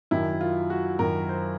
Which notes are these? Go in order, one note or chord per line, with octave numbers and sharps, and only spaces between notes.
F#2 D#3 E4
F4
F#4
F#2 D#3 A#4
C5